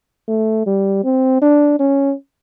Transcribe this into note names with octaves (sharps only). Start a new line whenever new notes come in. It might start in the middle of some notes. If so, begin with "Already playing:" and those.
A3
G3
C4
D4
C#4